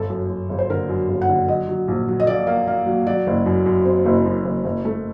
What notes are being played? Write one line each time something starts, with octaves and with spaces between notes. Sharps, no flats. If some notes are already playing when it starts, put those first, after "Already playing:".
Already playing: G1 A4
F#2
F#2
G1
C5
D3 A#4
F#2
G1
F#5
D3
F#3 D#5
F#3
A#1
F#3
D#5
A#2 D5
A#3
A#3
F#3
F#3 D5
F#1
F#2
F#2
C4
F#1
F#2
F#1
F#1
A3